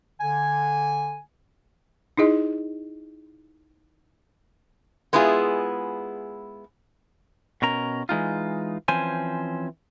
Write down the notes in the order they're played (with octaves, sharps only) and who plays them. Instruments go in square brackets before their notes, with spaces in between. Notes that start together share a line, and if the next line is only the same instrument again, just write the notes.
[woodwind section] D3 G#5
[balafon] D#4 E4 G#4 D#5
[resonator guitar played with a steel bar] G#3 B3 E4 F4 G#4
[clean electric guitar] B2 C#4 A#4 A#5
E3 G#3 D#4 F4
E3 F3 C4 C#4 C5 G#5